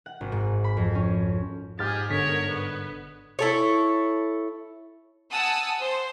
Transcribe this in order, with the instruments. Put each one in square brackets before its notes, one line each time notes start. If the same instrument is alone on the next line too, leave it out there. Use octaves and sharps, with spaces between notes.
[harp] F#5
G#1
G#2
B5
F2
C#4
[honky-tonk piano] G#2 F6 [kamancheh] G4 G#4 [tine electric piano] A6
[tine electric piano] G1 D3 B6 [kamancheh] A#4 C#5
[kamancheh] B3
[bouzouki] E4 A4 C#5
[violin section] F#5 G#5 A5 D#6 E6
C5